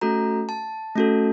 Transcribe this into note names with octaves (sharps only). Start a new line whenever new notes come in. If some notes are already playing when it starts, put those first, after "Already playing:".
A3 C#4 F#4 A4 A#5
A5
A3 C#4 F#4 A4